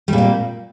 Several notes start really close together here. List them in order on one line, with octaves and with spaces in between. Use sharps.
G3 A#2 A#3